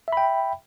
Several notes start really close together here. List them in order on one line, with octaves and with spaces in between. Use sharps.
E5 B5 G5